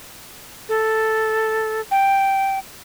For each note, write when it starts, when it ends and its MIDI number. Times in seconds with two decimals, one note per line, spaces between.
0.69 1.81 69
1.91 2.59 79